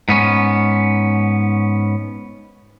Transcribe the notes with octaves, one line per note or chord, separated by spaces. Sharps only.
G#2 B3 C#4